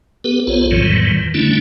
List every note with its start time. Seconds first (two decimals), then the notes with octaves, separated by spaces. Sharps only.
0.24 B3 G4 A4 B4
0.47 A#1 B3 F4 A4 C5 C#5
0.71 F2 A2 D#3 E3 F#3 G3
1.34 D3 G3 A3 C#4 D4 E4